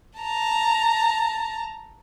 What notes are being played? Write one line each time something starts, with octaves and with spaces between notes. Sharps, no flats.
A5 A#5